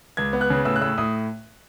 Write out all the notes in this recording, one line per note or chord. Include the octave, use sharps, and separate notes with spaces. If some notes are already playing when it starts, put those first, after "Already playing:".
C#2 G#6
B3
F#6
C#3
A2 E6
F#6
A2 E6
A2 D#6